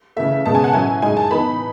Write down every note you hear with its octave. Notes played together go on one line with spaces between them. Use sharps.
C#3 E3 A3 E5
B2 G#3 C#4 A5
G#5
F#5
A2 F#3 C#4 E4 G#5
A2 G#3 D#4 G#5
A5
E3 B3 D#4 B5